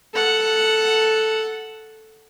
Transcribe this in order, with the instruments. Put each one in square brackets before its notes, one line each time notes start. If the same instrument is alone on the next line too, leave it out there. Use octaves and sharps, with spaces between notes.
[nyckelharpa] A4 F#5